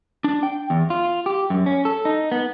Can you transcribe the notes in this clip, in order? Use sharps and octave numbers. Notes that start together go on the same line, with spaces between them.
D4
G5
E2
F4
G4
F#2
C#4
A4
D#4
B3